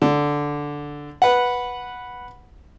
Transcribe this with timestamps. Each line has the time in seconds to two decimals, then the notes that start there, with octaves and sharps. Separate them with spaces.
0.02 D3
1.22 B4 F#5